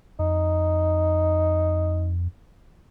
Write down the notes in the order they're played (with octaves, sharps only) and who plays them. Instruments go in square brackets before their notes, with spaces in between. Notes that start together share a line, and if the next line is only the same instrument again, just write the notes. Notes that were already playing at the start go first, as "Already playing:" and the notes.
[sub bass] F2 [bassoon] D#4